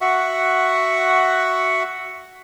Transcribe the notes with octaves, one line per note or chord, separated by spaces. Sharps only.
F#4 E5 F#5 C#6